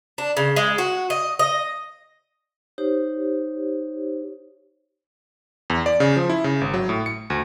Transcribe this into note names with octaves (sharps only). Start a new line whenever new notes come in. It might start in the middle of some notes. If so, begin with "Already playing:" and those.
D4
C#3
G#3
F#4
D#5
D#5
D#4 G4 C5 C#5
E2
D5
C#3
F3
E4
C#3
G#1
F#3
A2
C#7
D2